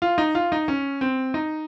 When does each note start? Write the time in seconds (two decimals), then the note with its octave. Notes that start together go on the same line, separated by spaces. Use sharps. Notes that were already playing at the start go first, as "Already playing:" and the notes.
0.02 F4
0.18 D#4
0.35 F4
0.52 D#4
0.68 C#4
1.01 C4
1.34 D#4